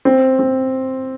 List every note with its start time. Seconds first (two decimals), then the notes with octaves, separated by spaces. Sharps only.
0.05 C4
0.39 C4